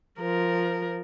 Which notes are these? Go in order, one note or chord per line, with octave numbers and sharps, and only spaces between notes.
F3 A#4